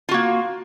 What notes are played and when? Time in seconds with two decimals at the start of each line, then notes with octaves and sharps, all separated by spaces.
0.09 F4
0.11 F#4
0.14 A#3